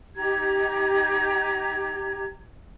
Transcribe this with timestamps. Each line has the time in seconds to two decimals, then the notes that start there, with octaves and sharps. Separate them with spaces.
0.16 D#4 G4 A#5 G#6